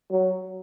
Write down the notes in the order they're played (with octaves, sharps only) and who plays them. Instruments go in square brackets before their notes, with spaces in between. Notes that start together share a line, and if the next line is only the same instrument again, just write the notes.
[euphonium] F#3